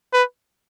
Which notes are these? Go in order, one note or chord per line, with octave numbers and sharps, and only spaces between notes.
B4